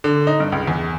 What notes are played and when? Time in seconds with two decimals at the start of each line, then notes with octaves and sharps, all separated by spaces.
0.04 D3
0.27 D#4
0.40 G2
0.52 C#2
0.68 E2